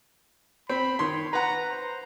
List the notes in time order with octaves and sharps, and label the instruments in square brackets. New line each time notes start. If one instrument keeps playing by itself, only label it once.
[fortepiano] C4 [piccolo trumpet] B5
[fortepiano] D#3 C6 [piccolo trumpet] C#5
[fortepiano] B4 F#5 [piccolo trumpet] A#5
[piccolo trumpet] C5